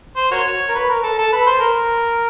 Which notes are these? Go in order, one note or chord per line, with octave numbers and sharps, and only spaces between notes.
C5
F#4 A#4 C#5
A#4
B4
A#4
A4
A4
B4
C5
A#4